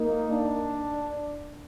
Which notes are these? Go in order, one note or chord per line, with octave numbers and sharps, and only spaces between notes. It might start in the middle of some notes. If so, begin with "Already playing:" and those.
Already playing: A#3 D#4
D4